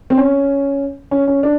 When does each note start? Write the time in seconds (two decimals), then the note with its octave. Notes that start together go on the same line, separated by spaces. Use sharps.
0.10 C4
0.17 C#4
1.11 C#4
1.28 C#4
1.43 D4